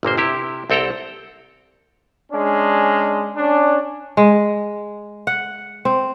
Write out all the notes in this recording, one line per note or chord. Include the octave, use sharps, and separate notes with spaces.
G1 A#2 A#3 C5
C3 E4 G4
C2 C4 A4 G5 A#5
G#3 C#4 D4
C#4 D4
G#3
F#5
C4